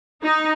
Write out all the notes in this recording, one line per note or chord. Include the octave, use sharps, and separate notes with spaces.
D#4